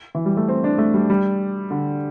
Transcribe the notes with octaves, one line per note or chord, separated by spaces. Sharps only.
E3
G3
A3
C4
D4
A3
G3
G3
D3